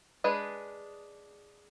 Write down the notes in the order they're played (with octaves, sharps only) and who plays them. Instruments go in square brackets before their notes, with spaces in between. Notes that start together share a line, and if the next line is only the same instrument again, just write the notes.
[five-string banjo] G#3 D4 G#4 B4